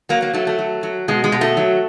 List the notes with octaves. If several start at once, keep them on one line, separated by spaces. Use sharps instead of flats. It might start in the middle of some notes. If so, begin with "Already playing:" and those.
F#3 A#3
A#3
F#3 A3
A3
F#3
F#3
B2 G#3
G#3
B2
A3
F#3